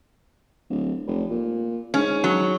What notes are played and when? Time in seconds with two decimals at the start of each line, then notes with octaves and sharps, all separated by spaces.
0.69 D1
1.07 F1
1.29 A#2
1.94 G#2 C#4
2.24 F#3